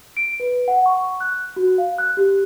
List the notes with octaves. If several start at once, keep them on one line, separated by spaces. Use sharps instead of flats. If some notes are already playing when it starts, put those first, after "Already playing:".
D7
B4
F#5
C#6
F#6
F#4
F5
F#6
G4